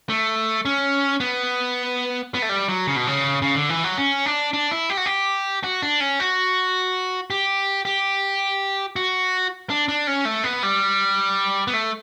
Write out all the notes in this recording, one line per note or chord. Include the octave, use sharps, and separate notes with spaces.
A3
C#4
B3
B3
A3
G3
F#3
C#3
B2
C#3
C#3
D3
E3
F#3
C#4
D4
D4
E4
G4
F#4
G4
F#4
D4
C#4
F#4
G4
G4
F#4
D4
D4
C#4
A3
B3
G3
B3
A3